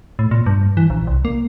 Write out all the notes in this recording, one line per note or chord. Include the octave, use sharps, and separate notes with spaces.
A2
A#2
G2
E3
A#1
C2
A#3